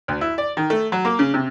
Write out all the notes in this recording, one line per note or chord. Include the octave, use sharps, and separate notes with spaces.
D2
E4
D5
D#3
A3
F#3
A#3
C#3
C3